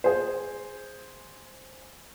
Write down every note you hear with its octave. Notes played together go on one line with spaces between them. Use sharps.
G#4 C5